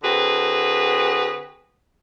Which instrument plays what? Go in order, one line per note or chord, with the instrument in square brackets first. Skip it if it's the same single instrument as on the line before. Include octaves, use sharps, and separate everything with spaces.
[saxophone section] D3 C4 F#4 G#4 B4